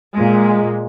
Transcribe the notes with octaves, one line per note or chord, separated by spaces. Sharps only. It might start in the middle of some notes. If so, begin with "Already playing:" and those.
A#2 G#3